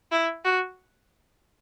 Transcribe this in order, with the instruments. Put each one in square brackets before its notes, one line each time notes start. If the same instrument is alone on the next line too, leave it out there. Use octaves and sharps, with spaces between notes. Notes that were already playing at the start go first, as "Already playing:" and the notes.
[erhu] E4
F#4